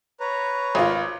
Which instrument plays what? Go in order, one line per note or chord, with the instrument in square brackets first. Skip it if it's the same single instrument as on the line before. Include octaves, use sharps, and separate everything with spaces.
[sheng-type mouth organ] B4 C#5 A#5
[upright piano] G#1 F4